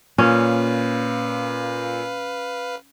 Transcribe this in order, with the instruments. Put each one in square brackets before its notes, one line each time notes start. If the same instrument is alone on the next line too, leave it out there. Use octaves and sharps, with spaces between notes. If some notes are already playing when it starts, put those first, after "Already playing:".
[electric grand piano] A#2 [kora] C#4 [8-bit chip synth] B4 F5